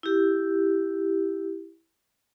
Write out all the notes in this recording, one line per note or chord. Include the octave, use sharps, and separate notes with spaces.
E4 G4